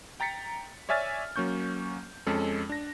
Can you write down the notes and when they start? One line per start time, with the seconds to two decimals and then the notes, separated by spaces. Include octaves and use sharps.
0.20 G5 A#5 A6 B6 C#7
0.89 C#5 D5 E5 G#5 F6 A6
1.36 F#3 A#3 C#4 C#6 G6
2.27 F2 G#3 C#4 A4
2.69 D4 A#6